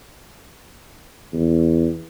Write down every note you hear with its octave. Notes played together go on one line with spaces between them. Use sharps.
E2